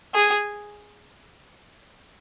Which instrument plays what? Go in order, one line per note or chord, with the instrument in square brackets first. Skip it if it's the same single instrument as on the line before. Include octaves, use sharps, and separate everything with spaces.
[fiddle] G#4